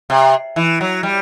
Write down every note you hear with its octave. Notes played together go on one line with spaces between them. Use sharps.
C3
E3
F#3
G3